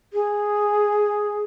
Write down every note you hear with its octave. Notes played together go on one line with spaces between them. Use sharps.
G#4